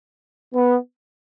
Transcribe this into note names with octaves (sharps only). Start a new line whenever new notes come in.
B3